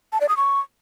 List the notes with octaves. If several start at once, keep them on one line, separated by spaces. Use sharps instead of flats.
A5
D5
D#6
C#6